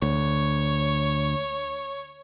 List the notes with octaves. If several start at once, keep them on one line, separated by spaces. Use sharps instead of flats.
D2 C#5